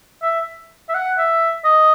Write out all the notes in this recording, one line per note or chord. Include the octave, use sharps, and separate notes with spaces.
E5
E5
F#5
E5
D#5